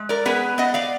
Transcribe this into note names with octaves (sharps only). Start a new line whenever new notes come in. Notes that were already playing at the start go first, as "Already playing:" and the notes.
Already playing: G#3
A#4 D5
B3 G#4 B4
B3 D#5 F#5
D5 F5